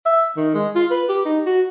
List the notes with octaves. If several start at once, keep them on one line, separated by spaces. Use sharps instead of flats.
E5
D#3
G#3
F4
B4
G4
D#4
F#4